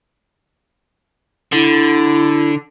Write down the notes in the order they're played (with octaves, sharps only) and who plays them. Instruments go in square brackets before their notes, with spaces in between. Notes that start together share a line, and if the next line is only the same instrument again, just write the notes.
[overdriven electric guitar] D3 [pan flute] E4